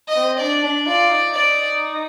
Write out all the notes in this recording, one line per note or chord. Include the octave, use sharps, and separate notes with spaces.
D#5
C4
D4 D5
D4
F4 D5
D#4
D5